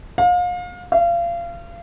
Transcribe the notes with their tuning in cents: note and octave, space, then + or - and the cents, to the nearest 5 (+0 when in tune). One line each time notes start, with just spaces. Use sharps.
F5 +35
F5 -30